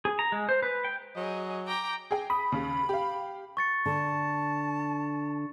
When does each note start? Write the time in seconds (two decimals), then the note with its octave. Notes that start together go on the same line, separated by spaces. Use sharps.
0.05 G#4
0.19 A#5
0.32 G#3
0.49 C5
0.63 B4
0.84 G5
1.16 F#3 G#4 D#5
1.67 G5 A#5 D6
2.11 G#4 G5
2.30 B5 D#6
2.52 D#2 C#3
2.89 G4 F5
3.57 C#6 A6 C#7
3.86 D3 A5